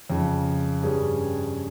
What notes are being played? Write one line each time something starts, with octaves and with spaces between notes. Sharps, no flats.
F2 C#3 F3
G2 G3 C#4 G#4